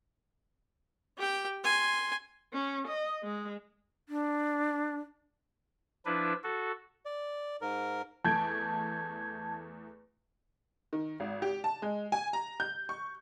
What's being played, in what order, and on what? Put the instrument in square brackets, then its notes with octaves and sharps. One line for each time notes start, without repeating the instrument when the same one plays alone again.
[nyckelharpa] G4 G5
G#5 C6
[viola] C#4
D#5
G#3
[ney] D4
[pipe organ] F3 D4 E4 B4
F#4 A4
[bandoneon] D5
G#2 A#4
[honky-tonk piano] E2 A3 D7 [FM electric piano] A5 G6 G#6
[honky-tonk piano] D#3
G#1
G4
A5
G#3
G#5
A#5
G6
C#6